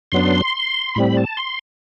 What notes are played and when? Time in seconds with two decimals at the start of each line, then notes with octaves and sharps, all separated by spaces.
0.12 F#2 F#3 B3 D4 C6
0.95 A2 G3 C4 B5
1.17 A5
1.37 C6